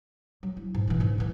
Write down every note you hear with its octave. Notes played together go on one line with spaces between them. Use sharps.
F#3
E4
G#2
B2 E3
G#2 C#3
D#3 E3